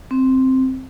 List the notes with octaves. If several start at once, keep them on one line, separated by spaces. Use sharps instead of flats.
C4